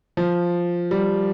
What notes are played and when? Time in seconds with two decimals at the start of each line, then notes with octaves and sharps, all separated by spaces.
0.17 F3
0.91 G3